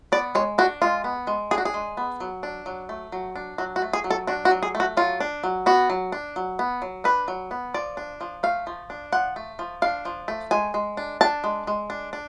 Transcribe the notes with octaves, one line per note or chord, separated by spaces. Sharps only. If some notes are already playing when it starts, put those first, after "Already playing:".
B3 D5
G#3 C#5
D4 F#4
G#3 F4
B3
G#3
D4 G#4
F#4
G#4
G#3
B3
F#3
D4
F#3
A3
F#3
D4
F#3 F#4
F#4
A3
G#4
F#3
A4
D4 F#4
F#4
F#3
G#4
A3
F#4
F#3 F4
D4
F#3
B3 F#4
F#3
D4
F#3
B3
F#3
D4 B4
F#3
B3
F3 D5
D4
F3
A3 F5
F3
D4
F3 F#5
A3
F3
D4 F5
F3
A3
G#3 G#5
G#3
D4
D4 A5
G#3
G#3
D4
D4